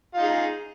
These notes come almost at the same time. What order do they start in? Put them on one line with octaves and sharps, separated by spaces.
F4 D#4 G#4